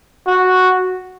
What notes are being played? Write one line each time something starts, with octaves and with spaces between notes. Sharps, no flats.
F#4